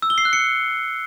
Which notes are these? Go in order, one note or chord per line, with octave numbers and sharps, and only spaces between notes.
E6
G7
C7
F#6
C#7